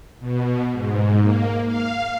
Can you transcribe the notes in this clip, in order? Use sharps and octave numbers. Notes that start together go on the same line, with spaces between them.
B2
G#2
A#3
F5